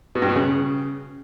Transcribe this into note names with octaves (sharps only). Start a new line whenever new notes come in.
B2
G2
B2
C#3